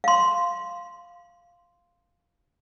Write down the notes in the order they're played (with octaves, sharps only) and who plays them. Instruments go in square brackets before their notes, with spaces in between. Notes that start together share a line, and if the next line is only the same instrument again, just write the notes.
[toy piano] F5 C6